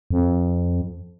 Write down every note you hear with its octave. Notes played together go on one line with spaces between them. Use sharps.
F2